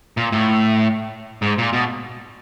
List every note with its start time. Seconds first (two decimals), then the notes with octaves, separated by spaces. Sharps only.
0.17 A#2
0.32 A2
1.42 G#2
1.58 A#2
1.73 B2